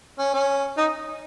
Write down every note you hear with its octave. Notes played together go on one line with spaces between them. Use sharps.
C#4
C#4
D#4